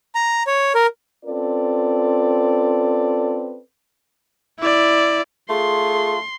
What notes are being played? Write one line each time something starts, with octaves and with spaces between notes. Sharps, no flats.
A#5
C#5
A#4
C4 C#4 F4 A4 B4 D5
E4 D5
A3 F4 G#4 C6